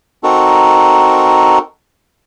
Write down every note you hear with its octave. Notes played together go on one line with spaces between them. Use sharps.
C4 D#4 F#4 A4 A#4